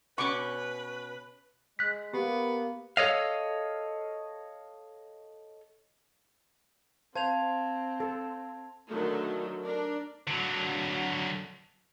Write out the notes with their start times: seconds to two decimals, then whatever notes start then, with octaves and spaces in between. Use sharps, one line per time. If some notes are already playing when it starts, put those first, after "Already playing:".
0.18 B2 C#4 B4 C#6 D6
1.79 G#3 F#6 B6
2.14 A#3 B3 G4
2.97 A4 C#5 D#5 F5
7.16 C4 C5 F5 A5 G#6 F7
8.00 A4
8.89 D3 D#3 F#3 A3
9.64 D4 A#4
10.27 D3 F#3